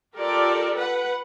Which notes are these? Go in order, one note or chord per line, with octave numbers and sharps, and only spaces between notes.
F4 G4 A4 A#4 D5
B4 F#5